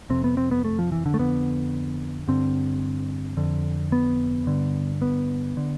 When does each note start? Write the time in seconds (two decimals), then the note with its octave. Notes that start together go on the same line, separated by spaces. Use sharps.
0.10 F2 C3 C4
0.24 B3
0.37 C4
0.51 B3
0.65 A3
0.79 F3
0.92 E3
1.06 D3
1.14 A3
1.19 F2 D3 B3
2.28 G2 D3 C4
3.37 F2 D3
3.92 B3
4.47 G2 D3
5.02 B3
5.57 D3